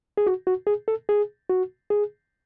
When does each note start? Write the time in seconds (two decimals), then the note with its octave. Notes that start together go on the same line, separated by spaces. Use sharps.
0.17 G#4
0.27 F#4
0.47 F#4
0.67 G#4
0.88 A4
1.09 G#4
1.49 F#4
1.90 G#4